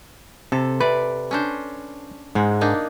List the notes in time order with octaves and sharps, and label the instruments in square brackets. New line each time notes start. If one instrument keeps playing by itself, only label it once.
[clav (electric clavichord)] C3 [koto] A4
[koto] C3 D5 [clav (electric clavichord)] B4
[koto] C#4 D4 C5
[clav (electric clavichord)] G#2 [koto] G#3
[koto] A#3 D4 D#4